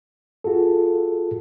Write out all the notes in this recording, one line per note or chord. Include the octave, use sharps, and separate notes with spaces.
F4 F#4 G#4 A4